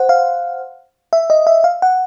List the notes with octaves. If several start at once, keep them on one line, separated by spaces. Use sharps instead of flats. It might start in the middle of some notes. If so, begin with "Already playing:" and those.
Already playing: C5 F#5
F5
E5
D#5
E5
F5
F#5